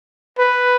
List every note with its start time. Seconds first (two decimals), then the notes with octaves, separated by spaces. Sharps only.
0.39 B4